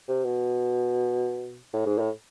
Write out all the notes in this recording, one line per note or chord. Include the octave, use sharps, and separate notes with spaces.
C3
B2
A2
G#2
A2